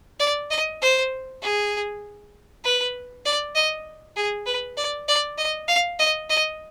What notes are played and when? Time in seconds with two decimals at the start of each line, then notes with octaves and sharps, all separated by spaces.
0.20 D5
0.51 D#5
0.82 C5
1.42 G#4
2.64 B4
3.25 D5
3.56 D#5
4.16 G#4
4.46 B4
4.77 D5
5.08 D5
5.38 D#5
5.68 F5
5.99 D#5
6.30 D#5